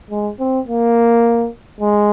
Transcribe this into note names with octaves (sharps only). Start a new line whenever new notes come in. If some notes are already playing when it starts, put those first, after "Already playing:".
G#3
C4
A#3
G#3